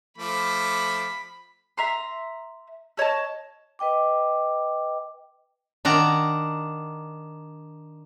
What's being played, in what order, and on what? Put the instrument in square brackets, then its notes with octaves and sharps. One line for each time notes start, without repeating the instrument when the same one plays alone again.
[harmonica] F3 A3 D6 [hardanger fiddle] B5
[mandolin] E5 A#5 C6
A4 C#5 D#5 A5
[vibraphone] B4 D#5 G5 D6
[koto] D#3 D4 F#5 A#5